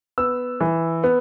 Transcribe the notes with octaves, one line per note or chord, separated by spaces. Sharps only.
B3 E6
E3
B3